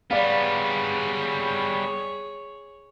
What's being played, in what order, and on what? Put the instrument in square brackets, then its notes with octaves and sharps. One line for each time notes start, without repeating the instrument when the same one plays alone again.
[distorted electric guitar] G3 B3 [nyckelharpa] G#4 C#5 [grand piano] D5 F5